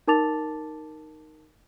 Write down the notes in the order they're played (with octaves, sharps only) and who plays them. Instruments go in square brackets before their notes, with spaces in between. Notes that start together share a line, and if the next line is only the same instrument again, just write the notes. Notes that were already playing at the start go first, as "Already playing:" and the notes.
[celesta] D#4 A#4 A5 D6 A6 F7